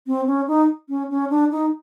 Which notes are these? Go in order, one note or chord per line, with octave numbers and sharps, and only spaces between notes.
C4
C#4
D#4
C#4
C#4
D4
D#4